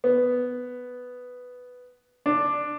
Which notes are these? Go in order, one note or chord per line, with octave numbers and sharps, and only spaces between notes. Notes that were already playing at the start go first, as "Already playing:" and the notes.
B3
D4